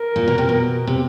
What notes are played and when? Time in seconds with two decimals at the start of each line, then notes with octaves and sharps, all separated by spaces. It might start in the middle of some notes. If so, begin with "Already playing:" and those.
Already playing: A#4
0.16 A#2
0.28 B2
0.38 C3
0.49 B2
0.87 C3